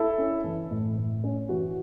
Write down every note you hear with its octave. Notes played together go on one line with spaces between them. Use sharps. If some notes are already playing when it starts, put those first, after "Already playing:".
Already playing: E4 A4
C#4
E3
A2
A2
C#4
E3 F#4